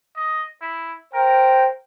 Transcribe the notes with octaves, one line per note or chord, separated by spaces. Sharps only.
D#5
E4
A#4 C5 G5